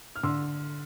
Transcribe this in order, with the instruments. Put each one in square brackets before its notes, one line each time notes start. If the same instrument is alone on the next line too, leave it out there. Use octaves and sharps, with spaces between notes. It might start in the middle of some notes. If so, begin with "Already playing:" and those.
[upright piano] F6
D3 C6 E6